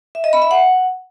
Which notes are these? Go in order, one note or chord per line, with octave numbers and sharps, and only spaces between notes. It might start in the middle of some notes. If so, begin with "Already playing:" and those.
E5
D#5
B5
E5
F#5